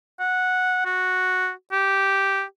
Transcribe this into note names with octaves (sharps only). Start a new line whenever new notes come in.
F#5
F#4
G4